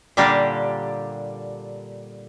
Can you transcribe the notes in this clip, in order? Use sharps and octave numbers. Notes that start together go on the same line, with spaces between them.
A#2 D3 G3 A#3 D4 G4